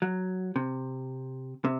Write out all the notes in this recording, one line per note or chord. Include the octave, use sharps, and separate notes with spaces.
F#3
C3
C3